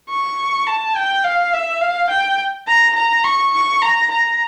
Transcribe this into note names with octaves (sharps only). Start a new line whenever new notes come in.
C#6
A5
G5
F5
E5
F5
G5
A#5
A#5
C#6
C#6
A#5
A#5